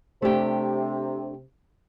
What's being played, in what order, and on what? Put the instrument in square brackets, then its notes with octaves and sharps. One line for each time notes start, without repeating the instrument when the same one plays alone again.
[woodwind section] C3 [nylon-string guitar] A3 D4 G4